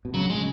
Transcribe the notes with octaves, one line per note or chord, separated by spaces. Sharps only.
B2
C#3 F#3
C#3
D3 G#3
C#3